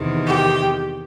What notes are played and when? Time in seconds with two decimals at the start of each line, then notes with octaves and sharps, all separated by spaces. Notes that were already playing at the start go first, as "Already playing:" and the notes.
Already playing: E2 C3 D#3
0.26 G4